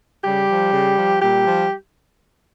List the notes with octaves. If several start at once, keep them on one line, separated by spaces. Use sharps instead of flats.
C#3 G3 G4
F3
C#3
F3
A#2 G3 G4
F3